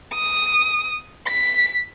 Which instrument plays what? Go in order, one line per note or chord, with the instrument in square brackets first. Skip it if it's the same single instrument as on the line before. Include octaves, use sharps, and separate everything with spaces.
[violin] D#6
B6